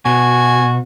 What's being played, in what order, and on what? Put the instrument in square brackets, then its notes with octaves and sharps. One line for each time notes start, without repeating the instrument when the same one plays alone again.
[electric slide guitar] B2 [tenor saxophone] F#4 [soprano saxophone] G#5